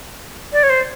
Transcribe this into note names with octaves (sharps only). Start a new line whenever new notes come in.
D5
C#5
C5